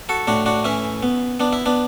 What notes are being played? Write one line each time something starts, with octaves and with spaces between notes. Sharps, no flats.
F#4 A4
A2 D4 F#4
D4 F#4
E3 C#4 E4
B3
B3 D4
E4
B3 D4